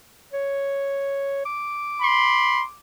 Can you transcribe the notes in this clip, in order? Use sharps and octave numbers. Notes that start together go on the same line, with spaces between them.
C#5
D6
B5 C6